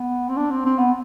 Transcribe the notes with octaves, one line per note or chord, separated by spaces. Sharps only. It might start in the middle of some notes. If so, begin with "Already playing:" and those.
Already playing: B3
C4
D4
C4
C4
B3